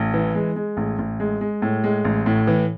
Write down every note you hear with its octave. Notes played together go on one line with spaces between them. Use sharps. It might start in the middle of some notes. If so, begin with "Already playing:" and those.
Already playing: A1
E3
G#3
G#3
A1
A1
G#3
G#3
A2
G#3
A1
A2
E3